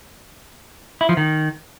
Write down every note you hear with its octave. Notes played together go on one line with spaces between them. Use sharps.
E4
F3
D#3